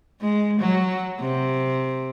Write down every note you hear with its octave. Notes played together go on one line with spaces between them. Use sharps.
G#3
F#3
C3